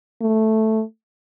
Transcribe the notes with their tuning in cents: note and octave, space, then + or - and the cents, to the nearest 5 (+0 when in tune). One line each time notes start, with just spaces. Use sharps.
A3 +0